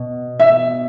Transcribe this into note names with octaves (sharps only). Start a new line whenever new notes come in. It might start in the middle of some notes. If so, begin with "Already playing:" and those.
Already playing: B2
E5